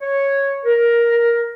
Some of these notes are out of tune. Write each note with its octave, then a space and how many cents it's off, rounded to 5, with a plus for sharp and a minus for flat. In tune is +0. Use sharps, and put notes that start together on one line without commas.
C#5 -5
A#4 +10